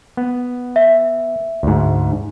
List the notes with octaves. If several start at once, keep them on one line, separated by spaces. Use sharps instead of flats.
B3
E5
D2 G#2